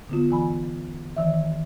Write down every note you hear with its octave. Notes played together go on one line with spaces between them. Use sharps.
D3 B3 F4
E3 G#5 B5
D#3 E3 E5